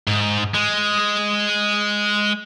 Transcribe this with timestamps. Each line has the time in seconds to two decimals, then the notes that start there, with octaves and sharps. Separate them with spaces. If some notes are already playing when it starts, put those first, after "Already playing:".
0.07 G#2
0.54 G#3